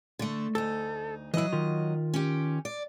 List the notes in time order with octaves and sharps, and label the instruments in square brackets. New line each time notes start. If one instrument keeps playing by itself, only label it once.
[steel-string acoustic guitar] D3 A3
[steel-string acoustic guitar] D2 D#4 [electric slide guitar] A4
[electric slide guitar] E3 E4 [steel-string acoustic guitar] F#3 D#5
[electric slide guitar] D#3 F4
[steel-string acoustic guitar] C#4 G4
D5